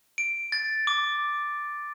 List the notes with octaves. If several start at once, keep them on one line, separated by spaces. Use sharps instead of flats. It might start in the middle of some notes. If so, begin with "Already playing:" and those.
D7
A6
D6